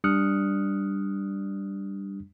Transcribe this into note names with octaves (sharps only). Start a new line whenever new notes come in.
G3 D4 D#6 F6 F#6 C#7